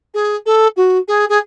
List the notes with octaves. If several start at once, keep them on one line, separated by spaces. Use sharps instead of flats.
G#4
A4
F#4
G#4
G#4